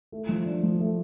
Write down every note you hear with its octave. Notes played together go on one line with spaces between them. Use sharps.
A3
F3
D4
F3
A3